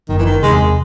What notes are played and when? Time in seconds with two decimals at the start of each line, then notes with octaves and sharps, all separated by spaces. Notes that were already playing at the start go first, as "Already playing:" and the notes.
0.09 F#1 D#3
0.19 E3
0.26 D#3
0.42 E2 C3 G#3